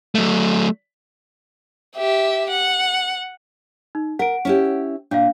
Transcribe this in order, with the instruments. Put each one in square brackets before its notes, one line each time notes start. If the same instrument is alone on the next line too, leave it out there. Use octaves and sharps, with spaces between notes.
[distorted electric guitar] F#3 A3
[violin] G4 E5
F#5
[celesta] D#4
[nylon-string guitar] A#4 [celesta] F#5 D7
[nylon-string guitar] C#4 E4 G4
[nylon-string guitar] A#2 [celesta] D4 F5